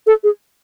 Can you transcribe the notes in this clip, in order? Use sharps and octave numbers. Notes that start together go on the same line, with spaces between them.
A4
G#4